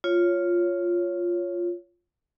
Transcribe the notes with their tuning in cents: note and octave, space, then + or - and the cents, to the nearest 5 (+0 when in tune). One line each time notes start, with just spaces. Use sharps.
F4 +0 C#5 +0